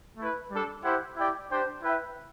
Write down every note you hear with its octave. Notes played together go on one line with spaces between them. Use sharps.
A3 E4 B4
G3 D4 A4
E4 G4 C5 F#5
E4 G4 D5 G5
D4 G4 C5 G5
E4 B4 E5 G5